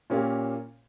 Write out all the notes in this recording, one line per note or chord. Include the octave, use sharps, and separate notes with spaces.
A#2 A#3 C#4 G4